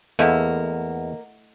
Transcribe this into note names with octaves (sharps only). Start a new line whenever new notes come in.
E2 A3 A#3 E4 D#5 F#5